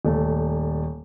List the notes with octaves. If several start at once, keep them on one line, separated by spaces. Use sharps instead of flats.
D#1 A3